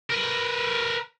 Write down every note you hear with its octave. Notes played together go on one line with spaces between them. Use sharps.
A#4 B4